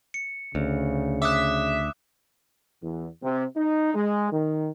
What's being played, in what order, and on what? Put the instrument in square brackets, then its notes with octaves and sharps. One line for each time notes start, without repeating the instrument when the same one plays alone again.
[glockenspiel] C#7
[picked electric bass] D2 [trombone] C#3
[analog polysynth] E5 [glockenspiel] D6 D#6 F#6
[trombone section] E2
C3
D#4
G#3
D#3